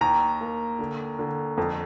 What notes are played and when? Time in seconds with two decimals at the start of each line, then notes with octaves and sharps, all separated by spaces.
0.01 D#2 A#5
0.41 A#3
0.79 D3
1.19 D3
1.58 F2